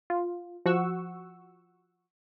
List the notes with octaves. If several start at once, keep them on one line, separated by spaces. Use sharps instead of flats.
F4
F3 F#4 F#5 C#6 E6